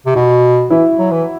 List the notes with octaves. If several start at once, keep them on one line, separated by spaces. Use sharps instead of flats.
C3
B2 F#4
E3 E4
F#3
E3